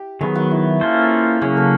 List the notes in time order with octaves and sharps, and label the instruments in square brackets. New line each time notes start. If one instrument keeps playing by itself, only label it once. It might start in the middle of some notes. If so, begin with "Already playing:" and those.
Already playing: [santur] G4
[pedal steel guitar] D#3 F#3 B3 [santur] G#4
[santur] F#4
E4
[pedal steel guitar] A#3 C#4 F4 A4 C5
[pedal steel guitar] C#3 F#3 A#3 C#4 [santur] G#4
[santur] A4